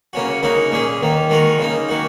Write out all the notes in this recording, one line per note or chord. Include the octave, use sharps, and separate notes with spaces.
C#3 A#3 C#4 F#4
C#3 A#3 D#4 F#4
A#2 A#3 C#4 G#4
D#2 D#3 A#3
D#3 G#3 F#4 A#4
C#3 A#3 D#4
D#3 A#3 F#4